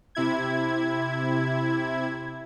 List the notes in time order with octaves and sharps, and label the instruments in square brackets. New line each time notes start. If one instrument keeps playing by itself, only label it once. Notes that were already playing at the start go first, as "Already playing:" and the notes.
[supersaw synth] C3 E4 G#6